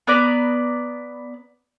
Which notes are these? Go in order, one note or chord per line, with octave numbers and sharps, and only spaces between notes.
B3 B4 D5 A#5